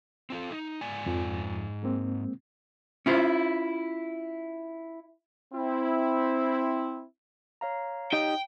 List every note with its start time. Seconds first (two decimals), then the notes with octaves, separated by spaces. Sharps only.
0.30 C4 F4 A4
0.52 D#4
0.81 G#2 D5 G#5
1.06 F2 F3
1.83 G#3 A#3 C4
3.06 C#4 E4 F4 C5
5.54 C4 E4
7.61 C#5 F5 A#5
8.13 D#4 G4 D#5 G5